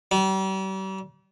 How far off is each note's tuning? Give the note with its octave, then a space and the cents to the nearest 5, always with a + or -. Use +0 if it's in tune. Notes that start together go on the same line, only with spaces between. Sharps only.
G3 -40